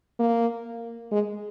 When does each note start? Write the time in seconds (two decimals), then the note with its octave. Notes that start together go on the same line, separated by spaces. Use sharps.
0.19 A#3
1.12 G#3